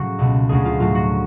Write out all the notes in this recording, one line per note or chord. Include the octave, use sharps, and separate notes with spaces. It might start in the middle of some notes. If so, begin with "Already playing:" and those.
Already playing: A2 C#3 F#3 F#4
C#2 B2 A3
D2 C#3 G#3 G#4
F4
A2 F#3 A3 F4
F#4